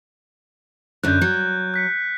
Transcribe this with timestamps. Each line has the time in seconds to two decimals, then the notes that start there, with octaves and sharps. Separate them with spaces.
1.03 F#2 D3 F#6 G6
1.21 F#3
1.74 F#6 B6 C#7